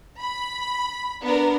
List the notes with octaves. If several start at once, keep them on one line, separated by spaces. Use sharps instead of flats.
B5
B3 D4 A#4